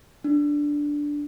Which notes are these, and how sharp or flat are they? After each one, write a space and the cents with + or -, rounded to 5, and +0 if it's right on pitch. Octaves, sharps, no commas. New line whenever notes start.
D4 -5